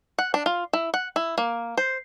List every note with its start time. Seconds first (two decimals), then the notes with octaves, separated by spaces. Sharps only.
0.18 F#5
0.34 D4
0.46 F4
0.73 E4
0.94 F#5
1.16 E4
1.38 A#3
1.77 C5